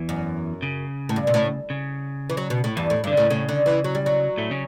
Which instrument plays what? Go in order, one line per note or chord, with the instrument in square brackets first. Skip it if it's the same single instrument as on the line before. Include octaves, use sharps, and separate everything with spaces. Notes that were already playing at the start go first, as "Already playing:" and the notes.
Already playing: [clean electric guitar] E2 E3
[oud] F#2
[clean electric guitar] C#3
[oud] A2
G2
B2
A2
[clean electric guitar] C#3
[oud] E3
F#3
B2
A2
[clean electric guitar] E2 E3 [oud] G2
[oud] A2
[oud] G2 [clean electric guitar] D3
[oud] A2 [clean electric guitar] C#3
[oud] A2 [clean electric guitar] C#3
[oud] D3
E3
F#3
G3
F#3
[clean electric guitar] A2 A3
C#3 C#4